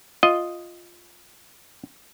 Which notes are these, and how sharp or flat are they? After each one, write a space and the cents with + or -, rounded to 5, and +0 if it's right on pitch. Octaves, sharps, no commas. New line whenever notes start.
F4 +0 D#5 +0